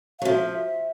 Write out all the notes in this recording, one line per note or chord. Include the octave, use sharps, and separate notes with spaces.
F#3 F5
F3 E5